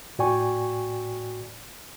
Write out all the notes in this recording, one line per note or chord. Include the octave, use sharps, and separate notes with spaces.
A2 F#4 D5 G5 G#5 C#6